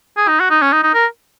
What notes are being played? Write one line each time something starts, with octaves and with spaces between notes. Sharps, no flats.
G#4
D#4
F#4
D#4
C#4
D#4
D#4
A#4